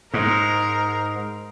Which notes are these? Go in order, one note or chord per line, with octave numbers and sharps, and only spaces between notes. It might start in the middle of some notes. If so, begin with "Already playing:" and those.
G#2 A#4